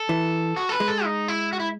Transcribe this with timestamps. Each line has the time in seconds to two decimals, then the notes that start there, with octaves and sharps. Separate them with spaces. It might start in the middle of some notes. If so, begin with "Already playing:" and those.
Already playing: A4
0.09 E3
0.56 F#4
0.69 A4
0.72 B4
0.80 G#3
0.88 A4
1.05 D#4
1.28 E4
1.53 F#4
1.60 E4